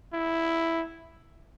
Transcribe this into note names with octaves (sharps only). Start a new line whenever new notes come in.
E4